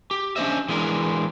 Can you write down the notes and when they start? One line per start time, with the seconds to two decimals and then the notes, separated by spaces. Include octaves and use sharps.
0.11 G4
0.36 C#4 D4 F4 C5 D#5 E5
0.68 E3 G#3 B3 D4 A#4